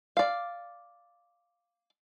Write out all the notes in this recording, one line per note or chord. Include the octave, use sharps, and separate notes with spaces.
D5 F5